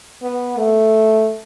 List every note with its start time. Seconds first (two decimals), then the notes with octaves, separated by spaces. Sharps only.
0.23 B3
0.57 A3